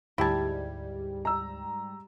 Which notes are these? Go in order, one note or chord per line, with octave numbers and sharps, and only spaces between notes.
D2 G#2 G3 E4 G4 A5 G#6
A#5 E6